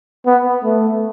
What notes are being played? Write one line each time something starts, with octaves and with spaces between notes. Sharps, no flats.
B3
A3